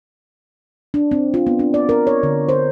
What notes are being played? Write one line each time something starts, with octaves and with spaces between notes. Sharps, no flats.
D4
C4
F4
B3
D4
D5
A#4
C#5
D3
C5